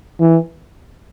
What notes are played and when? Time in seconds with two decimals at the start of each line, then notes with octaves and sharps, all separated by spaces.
0.20 E3